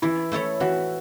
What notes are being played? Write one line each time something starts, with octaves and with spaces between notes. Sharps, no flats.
E3 E4
A3 E4 A4 C#5
E3 F#4